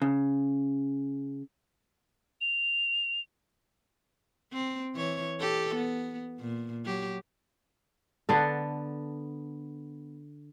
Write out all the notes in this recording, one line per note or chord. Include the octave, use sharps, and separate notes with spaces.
C#3
F7
C4
E3 C#5
G4 A4
B3
A#2
F#3 G4
D3 B3 A4